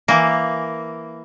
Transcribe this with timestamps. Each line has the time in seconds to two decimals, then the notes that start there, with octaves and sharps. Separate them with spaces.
0.08 E3 A#3